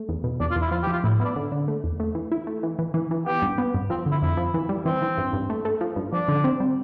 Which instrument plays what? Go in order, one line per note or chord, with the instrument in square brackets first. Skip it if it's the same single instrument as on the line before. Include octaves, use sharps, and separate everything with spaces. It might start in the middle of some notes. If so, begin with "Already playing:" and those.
Already playing: [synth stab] A3
E2
B2
[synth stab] E2 [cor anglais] D4
[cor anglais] F4
[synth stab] E2
[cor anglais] E4
[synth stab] F3 [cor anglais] F4
[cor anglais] G4
[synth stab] F3
[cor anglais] F4
[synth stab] A2 [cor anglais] E4
[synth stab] B3 [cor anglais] E4
[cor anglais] D4
[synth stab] D3
D3
A3
E2
A3
E3
E4
A3
E3
E3
E3
E3
[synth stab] B3 [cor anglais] G4
[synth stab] G2
B3
G2
[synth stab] F3 [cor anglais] C4
[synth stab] D3
[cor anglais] E4
[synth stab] F2 [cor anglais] E4
[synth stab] F3
E3
G3
[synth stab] E3 [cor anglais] C4
[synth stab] E3
G2
G2
A3
A3
F3
G2
[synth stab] F3 [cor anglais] D4
[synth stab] D3
C4
G3